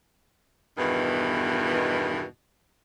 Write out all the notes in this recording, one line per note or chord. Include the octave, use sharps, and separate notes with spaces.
E2 G2 B2 D#3 E3